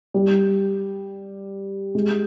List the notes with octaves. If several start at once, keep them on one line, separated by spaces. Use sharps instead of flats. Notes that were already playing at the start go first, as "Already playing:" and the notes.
G3
G#3